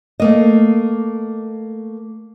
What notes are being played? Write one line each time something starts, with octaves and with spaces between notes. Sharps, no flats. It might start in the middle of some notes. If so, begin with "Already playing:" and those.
A3 A#3 D#5